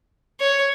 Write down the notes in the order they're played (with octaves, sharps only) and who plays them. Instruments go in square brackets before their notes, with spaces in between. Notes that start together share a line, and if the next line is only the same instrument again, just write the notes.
[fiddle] C#5